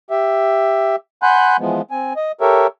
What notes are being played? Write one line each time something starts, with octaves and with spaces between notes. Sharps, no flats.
G4 E5
F#5 G#5 B5 C6 F#6 G6
E3 F3 G#3 B3
C4 G#5
D#5
G4 A4 A#4 C#5 E5